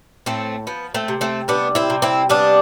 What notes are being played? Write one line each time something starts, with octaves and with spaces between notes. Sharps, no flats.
A2 A3 C4
F3 B3
A3 C4
C3
A3 C4
G3 B3 D4
C4 E4
C3
C4 E4
G3 B3 D4